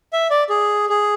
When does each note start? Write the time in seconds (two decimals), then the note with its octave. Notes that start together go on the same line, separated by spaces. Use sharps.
0.13 E5
0.30 D5
0.49 G#4
0.89 G#4